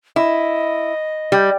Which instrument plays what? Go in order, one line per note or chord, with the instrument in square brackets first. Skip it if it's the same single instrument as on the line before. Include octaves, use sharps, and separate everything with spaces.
[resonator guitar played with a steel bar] E4 [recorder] D#5
[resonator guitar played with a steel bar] G3